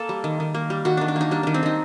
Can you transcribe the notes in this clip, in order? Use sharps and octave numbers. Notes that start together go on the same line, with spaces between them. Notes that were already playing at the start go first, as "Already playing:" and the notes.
Already playing: A#3 A4
G3
D#3
D#3
A#3
G3
D#3 F#4
D#3 D4
D4
A#3 D#4
G3 D4
D#3 D4
C4
D#3 D#4